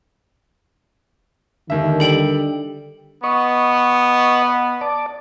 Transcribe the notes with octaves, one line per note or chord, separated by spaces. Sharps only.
D#2 D3 D#3 E5
G3 A4 G5 F#7
B3 D#5 C#6
D5 A5 D6